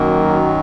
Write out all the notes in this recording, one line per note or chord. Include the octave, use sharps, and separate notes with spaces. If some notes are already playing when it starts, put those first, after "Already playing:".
Already playing: F#2 D#3 F#3 A#3